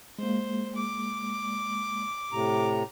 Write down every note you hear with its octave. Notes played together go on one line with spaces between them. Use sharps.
G#3 A#3 C5
D6
A2 C3 A#5